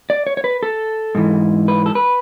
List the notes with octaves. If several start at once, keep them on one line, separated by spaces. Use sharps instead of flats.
D5
C#5
C#5
B4
A4
G#2 E3
B4
A4
B4